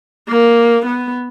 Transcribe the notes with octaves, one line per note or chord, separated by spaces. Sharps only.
A#3
B3